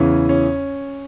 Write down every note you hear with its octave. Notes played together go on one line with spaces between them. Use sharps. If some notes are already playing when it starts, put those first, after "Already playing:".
Already playing: E2 C#3 E3 C#4
C#4